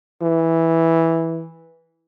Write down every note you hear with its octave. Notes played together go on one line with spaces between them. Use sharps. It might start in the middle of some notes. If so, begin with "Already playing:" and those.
E3